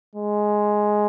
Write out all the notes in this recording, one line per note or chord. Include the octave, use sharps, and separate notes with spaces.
G#3